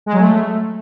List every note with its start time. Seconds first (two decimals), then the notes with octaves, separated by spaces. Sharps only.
0.06 G#3
0.13 F#3
0.20 A3